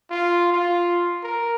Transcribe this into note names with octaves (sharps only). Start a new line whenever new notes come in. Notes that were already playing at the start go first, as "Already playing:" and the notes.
F4
F4
A#4